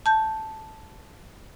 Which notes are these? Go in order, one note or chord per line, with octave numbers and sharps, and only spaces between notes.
A5 G6